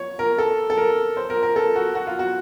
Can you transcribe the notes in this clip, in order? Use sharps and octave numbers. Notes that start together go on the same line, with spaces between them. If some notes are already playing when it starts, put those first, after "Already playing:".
Already playing: C#5
A#4
A4
A4
A#4
C5
A#4
A#4
A4
F#4
F#4
F4
F#4